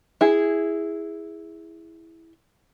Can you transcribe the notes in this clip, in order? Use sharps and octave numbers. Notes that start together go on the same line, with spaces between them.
E4 G#4